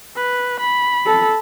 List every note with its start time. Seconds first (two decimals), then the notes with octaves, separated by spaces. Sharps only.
0.16 B4
0.60 B5
1.06 A4